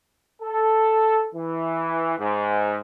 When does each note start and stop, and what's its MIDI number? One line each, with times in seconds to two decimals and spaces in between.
0.42 1.27 69
1.35 2.17 52
2.19 2.80 44